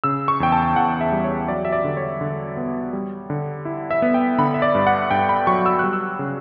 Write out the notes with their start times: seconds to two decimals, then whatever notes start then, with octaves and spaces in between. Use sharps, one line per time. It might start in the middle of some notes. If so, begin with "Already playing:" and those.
0.04 C#3 E6
0.28 C#6
0.40 E2 G5
0.52 A5
0.76 E2 F#5
1.01 E5
1.12 G3
1.24 C#5
1.48 F#3 D5
1.65 E5
1.72 D5
1.84 D3
1.97 C#5
2.21 D3
2.57 B3
2.93 G3
3.30 D3
3.65 E4
3.91 E5
4.02 B3
4.14 G5
4.38 D3 B5
4.54 E5
4.62 D5
4.75 G2
4.87 F#5
5.11 G2 G5
5.29 B5
5.47 F#3 C#6
5.66 E6
5.79 G3 F#6
5.93 E6
6.19 C#3